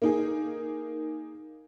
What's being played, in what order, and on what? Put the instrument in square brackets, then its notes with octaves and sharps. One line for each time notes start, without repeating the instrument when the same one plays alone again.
[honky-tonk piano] A#3 D#4 G#4